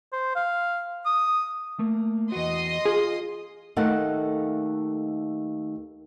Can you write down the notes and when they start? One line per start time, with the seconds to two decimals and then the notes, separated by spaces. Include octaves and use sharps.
0.12 C5
0.36 F5
1.06 D#6
1.79 A3 A#3
2.32 E2 F#4 D#5 C6 D#6
2.86 F4 G#4
3.76 D#2 A3 A#3 D#4 A4 F#5